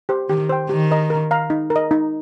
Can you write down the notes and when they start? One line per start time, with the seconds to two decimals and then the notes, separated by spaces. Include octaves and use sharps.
0.09 G4 C5
0.29 D#3 G4
0.49 C5 G5
0.70 D#3 G4
0.91 A#4 D#5 A#5
1.10 A#4
1.31 F5 A#5
1.50 D#4
1.70 A#4
1.76 D#5
1.91 D#4